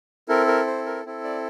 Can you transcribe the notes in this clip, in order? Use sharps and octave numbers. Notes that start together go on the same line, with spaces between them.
C4 E4 A4 A#4
A#4
C5
A#4
C4 E4 A4
D5